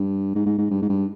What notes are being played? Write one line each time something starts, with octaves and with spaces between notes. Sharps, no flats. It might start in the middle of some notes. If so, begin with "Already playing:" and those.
Already playing: G2
G#2
G#2
G#2
G2
G#2
G2